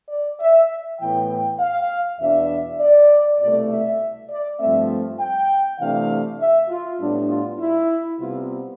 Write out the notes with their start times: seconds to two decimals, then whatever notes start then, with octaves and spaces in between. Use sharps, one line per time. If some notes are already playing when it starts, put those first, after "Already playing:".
0.09 D5
0.40 E5
1.00 A2 E3 B3 G5
1.30 G5
1.60 F5
2.19 E2 B2 B3 D4 E5
2.80 D5
3.40 C2 B2 A3 D5
3.70 E5
4.30 D5
4.60 G2 F3 A3 C4 E5
5.20 G5
5.80 C3 E3 A3 D4 F5
6.40 E5
6.70 F4
7.00 A2 G3 B3 D4
7.29 F4
7.60 E4
8.20 C3 G3 B3 F4